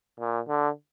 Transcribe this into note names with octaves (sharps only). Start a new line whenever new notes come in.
A#2
D3